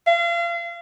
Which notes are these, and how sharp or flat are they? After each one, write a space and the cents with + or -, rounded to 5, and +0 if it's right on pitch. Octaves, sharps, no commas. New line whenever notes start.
F5 -35